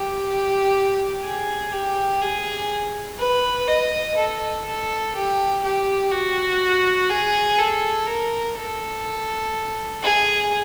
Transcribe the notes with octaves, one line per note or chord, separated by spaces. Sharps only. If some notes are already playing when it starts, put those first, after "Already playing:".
Already playing: G4
G#4
G4
G#4
B4
D#5
A4
A4
G4
G4
F#4
G#4
A4
A#4
A4
G#4